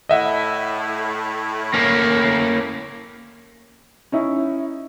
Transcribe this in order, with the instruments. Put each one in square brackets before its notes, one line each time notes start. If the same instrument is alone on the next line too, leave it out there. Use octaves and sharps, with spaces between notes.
[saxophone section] A2 [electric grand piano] D#5 E5 F#5
[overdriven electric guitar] A#3 C#4
[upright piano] C#4 D#4 E4